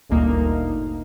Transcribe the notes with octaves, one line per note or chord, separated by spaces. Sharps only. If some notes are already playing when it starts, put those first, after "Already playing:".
G1 D2 A#2 A#3 D#4